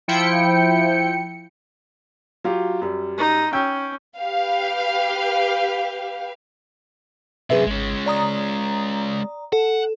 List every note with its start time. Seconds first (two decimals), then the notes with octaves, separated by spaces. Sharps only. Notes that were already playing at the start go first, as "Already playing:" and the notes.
0.08 F3 E4 G5 C#7
2.44 F#3 F4 G4
2.82 F#2 G3
3.18 D#4
3.53 C#4 G5 E6 G6
4.18 G4 B4 F5
7.50 F#2 C3 G#4 B4 E5
7.66 G#1 G#3 C#4
8.06 D5 A#5 D#6
9.53 A4 F#5